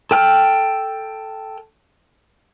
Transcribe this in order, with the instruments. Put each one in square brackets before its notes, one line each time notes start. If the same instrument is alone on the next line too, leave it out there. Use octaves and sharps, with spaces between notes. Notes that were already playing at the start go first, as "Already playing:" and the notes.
[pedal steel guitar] A4 G5 F6